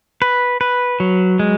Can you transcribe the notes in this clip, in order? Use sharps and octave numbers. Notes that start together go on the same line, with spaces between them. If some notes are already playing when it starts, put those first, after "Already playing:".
B4
B4
F#3
G#3